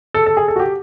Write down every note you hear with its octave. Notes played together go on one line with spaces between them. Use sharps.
A4
A4
G#4
A4
F#4
G4